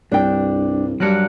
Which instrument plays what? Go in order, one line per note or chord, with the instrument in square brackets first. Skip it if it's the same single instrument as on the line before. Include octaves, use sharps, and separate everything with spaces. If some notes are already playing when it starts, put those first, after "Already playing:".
[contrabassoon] C2 [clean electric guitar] G2 [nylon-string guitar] D4 G5
[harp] G2 F#6 [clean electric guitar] F#3 A#4 F#5